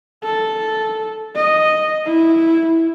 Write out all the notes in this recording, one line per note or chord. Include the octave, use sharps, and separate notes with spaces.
A4
D#5
E4